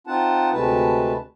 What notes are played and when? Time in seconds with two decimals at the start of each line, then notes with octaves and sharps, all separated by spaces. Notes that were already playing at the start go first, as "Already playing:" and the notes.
0.07 C4 D#4 F4 F#5 A5
0.52 D2 C3 G#3 A3 B4 A5